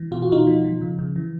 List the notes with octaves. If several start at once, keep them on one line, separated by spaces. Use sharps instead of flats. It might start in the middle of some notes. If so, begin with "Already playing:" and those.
Already playing: E3
B2 F4
F#4
B2 D#4 F4
F3
F3
C#3
C#3
E3